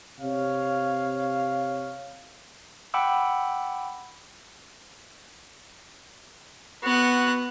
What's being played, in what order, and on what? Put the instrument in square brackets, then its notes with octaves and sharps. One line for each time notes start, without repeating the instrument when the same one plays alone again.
[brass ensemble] C3 C#5 F5
[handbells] F#5 G5 B5 D6 E6
[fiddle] B3 F#6 [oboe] F#4